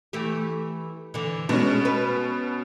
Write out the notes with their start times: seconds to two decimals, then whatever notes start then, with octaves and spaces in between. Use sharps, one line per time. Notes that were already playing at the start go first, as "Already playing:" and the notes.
0.13 E3 A3 G4
1.14 D3 E3
1.49 B2 G#3 C#4
1.85 B4